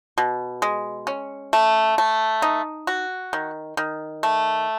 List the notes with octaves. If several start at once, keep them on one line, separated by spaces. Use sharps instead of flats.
B2
G#3
C#4
A3
A3
D#4
F#4
D#3
D#3
A3